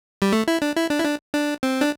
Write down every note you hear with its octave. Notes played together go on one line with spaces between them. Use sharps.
G3
A3
E4
D4
E4
D4
E4
D4
D4
C4
D4